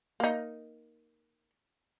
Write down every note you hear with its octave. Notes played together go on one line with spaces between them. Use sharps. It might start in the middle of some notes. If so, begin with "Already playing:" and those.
A#3 D#4